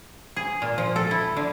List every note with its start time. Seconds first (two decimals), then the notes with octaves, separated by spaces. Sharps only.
0.36 G#4
0.62 A#2
0.78 F3
0.96 A4
1.11 E4
1.36 D3